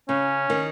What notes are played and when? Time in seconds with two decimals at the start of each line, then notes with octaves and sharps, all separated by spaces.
0.09 C#3 C#4
0.50 D#3